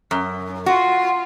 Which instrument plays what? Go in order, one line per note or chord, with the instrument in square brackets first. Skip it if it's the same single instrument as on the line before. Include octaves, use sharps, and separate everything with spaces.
[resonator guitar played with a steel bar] F#2
[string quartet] F4 [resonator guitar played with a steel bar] F#4